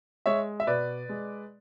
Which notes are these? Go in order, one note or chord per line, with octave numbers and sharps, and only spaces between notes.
G#3 C#5 E5
E5
B2 B4 D5
G#3